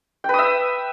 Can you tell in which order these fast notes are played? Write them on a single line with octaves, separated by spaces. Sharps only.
G5 B4 D#6 E5